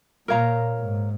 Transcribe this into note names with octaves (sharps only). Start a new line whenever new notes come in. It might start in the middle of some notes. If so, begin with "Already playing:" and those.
A#2 A#4 C#5 F5 A#5
G#2